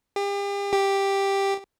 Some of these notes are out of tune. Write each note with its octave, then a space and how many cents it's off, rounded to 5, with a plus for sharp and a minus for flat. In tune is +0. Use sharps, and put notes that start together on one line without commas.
G4 +40
G4 +5